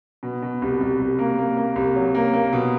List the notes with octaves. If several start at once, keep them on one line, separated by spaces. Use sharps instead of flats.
B2
B2
C2
C2
C2
A#3
A#3
A#3
C2
F#3
A#3
A#3
B2